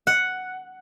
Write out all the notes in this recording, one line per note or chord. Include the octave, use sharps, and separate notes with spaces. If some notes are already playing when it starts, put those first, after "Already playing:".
F#5